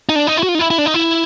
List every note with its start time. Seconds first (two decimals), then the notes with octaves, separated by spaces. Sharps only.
0.09 D#4
0.16 D4
0.27 D#4
0.37 E4
0.43 F#4
0.49 F4
0.55 D#4
0.59 E4
0.70 E4
0.78 D4
0.86 D#4
0.94 E4